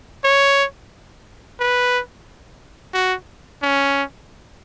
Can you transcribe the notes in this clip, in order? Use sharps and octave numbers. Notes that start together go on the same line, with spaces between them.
C#5
B4
F#4
C#4